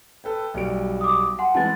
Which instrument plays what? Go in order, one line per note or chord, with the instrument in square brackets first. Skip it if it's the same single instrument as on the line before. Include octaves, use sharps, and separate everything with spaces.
[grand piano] A4 B4 G5
B1 G3 D7
[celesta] D6 D#6
F#5 G#5 C6
[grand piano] E3 G#3 B3 [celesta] A5 A6